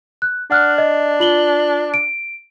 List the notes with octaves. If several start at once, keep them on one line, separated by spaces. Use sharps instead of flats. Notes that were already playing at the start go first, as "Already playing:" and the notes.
F#6
D4 F#5 F6 F#6
D#5
F4 F#7 G7
D7